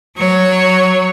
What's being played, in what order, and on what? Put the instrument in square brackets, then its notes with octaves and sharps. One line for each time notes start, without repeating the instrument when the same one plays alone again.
[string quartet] F#3 C#5